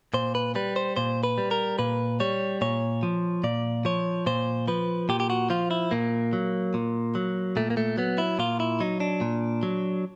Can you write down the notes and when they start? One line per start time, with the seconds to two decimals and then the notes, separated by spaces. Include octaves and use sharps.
0.14 A#2 C5
0.35 B4
0.55 G3 B4
0.76 C5
0.96 A#2 C5
1.23 B4
1.38 G3
1.51 A#4
1.79 A#2 B4
2.20 G3 C#5
2.61 A#2 C#5
3.03 F3
3.44 A#2 D5
3.85 F3 C#5
4.26 A#2 C5
4.68 F3 B4
5.09 A#2 G4
5.20 G4
5.30 F#4
5.50 F3 F4
5.71 E4
5.91 A#2 A#3
6.33 F#3
6.74 A#2
7.15 F#3
7.57 A#2 A3
7.70 A#3
7.77 A3
7.98 F#3 B3
8.18 E4
8.39 A#2 F4
8.60 E4
8.80 F#3 D#4
9.00 D4
9.21 A#2
9.63 F#3